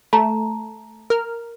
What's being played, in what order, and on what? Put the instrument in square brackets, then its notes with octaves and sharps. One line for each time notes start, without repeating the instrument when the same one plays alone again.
[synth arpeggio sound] A3 [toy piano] A5 A#5
[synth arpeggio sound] A#4 F6